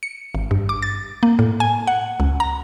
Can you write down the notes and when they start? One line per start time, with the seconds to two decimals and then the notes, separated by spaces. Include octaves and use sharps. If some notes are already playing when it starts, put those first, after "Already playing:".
0.03 C#7
0.35 G#1
0.51 G2
0.69 D6
0.82 A6
1.23 A#3
1.39 A2
1.60 G#5
1.87 F#5
2.20 C#2
2.40 A#5